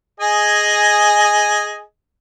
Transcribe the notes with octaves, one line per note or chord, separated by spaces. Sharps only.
G#4 D#5 G#5